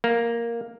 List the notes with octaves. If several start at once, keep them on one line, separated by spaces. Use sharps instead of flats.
A#3